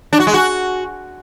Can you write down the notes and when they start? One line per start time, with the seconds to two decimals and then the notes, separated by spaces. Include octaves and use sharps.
0.13 D4
0.20 F#4
0.27 G#3
0.34 F#4